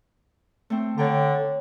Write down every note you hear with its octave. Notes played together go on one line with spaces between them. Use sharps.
A3 C4
D3 C#5 G5 A#5